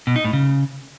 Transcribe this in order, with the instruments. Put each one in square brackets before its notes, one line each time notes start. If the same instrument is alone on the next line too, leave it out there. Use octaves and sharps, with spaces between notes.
[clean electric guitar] B2
D#4
A2
C#3